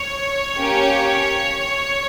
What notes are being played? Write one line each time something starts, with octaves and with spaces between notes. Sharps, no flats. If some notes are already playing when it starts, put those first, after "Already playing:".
Already playing: C#5
A#3 C#4 G4